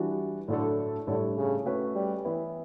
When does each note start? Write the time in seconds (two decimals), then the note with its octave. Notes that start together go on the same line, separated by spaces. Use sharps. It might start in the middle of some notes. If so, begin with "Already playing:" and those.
Already playing: E3 G3 D4 F#4
0.48 A2 D3 F#3 A3 D4 A4
1.07 A2 D3 G3 D4 A4 C#5
1.37 C#3
1.66 A3 C#4 F#4 B4
1.95 G3
2.25 E3 B3 E4